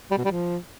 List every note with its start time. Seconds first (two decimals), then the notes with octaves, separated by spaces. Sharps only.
0.11 G3
0.18 B2
0.25 G3
0.32 F3